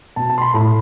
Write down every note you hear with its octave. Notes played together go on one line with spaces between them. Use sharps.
B2 A5
A5
C6
B5
A2 B5